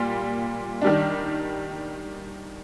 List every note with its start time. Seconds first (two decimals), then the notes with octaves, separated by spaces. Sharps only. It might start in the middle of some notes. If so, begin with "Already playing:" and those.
Already playing: A#2 G3 F4
0.82 D#3 G3 D4